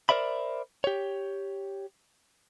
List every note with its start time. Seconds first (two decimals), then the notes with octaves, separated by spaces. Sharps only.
0.09 A#4 C5 D5 E5 B5
0.84 G4 C#5